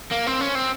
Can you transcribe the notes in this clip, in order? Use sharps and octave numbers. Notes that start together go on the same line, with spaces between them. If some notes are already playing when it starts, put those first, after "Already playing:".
A#3
C4
C#4
C4